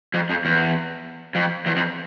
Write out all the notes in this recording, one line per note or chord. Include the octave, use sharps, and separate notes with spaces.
F2
F2
E2
F2
E2
F2